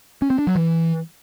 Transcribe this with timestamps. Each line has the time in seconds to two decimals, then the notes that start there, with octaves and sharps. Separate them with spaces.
0.22 C#4
0.30 C4
0.39 D4
0.47 F#3
0.55 E3